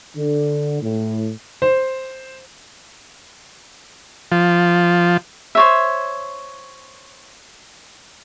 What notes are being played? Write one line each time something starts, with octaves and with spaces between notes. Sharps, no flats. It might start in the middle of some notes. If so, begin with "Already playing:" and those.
D3
A2
C5
F3
C5 C#5 E5